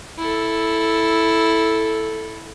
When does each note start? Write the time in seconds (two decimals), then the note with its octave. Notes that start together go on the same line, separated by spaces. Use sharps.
0.18 E4 A4